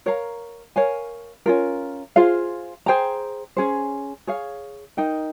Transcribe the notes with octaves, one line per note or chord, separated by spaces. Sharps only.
A#4 C#5 F5 A#5
A#4 C#5 F5 G#5
C#4 F4 A#4
F4 G#4 C5 F5
G#4 C5 G5 A#5
C#4 G#4 C5
G#4 C#5 F5
D#4 A#4 D#5 G5